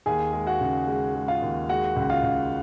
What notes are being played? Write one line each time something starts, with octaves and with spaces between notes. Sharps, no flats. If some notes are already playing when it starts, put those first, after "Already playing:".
D#2 G#4 G#5
G#3
F#4 F#5
C#3
G#3
G#3
F4 F5
D#2
G#3 F#4 F#5
C#2
F4 F5
C#2